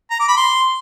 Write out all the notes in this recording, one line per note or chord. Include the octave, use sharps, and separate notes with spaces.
A#5
D6
B5
C6